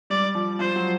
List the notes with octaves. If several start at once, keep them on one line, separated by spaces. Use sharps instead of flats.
G3 D5
F3
F3 C5
F#3